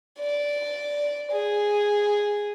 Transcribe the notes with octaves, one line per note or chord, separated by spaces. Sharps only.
D5
G#4